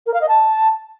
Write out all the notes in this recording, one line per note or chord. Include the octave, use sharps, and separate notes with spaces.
A#4
F5
D#5
A5